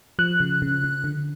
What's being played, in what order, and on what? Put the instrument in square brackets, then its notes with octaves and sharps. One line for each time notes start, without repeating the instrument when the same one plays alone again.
[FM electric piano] F3 F#6
C#3
C#3
C#3
D3